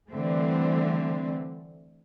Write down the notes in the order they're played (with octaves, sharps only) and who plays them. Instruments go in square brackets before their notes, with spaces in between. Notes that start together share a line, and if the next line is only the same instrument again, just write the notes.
[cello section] D3 E3 G3 A3 C4